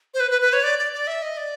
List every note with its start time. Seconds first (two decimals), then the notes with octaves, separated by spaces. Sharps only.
0.14 C5
0.20 B4
0.31 B4
0.42 B4
0.53 C#5
0.63 D5
0.79 D5
0.93 D5
1.07 E5
1.22 D#5
1.37 D5